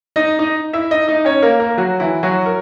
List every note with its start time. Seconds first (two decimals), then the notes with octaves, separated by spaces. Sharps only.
0.16 D#4 D#5
0.39 D#4 D#5
0.73 E4 E5
0.91 D#4 D#5
1.08 D#4 D#5
1.25 C#4 C#5
1.42 A#3 A#4
1.60 A#3 A#4
1.77 F#3 F#4
2.00 E3 E4
2.23 F#3 F#4
2.46 A#4